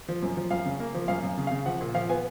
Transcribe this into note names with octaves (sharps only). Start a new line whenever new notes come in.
F3
F#2
F3
F#2 F5
C#3
A#3
F3
F#2 F5
F#2
C#3
F5
C#3
F3 F#5
A#2
F3 F5
B3 G#5